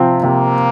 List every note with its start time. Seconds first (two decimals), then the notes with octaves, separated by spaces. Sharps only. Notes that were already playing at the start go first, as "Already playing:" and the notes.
Already playing: C3 F3 C4
0.23 C3 A#3